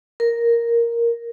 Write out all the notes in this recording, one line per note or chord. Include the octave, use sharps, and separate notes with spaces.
A#4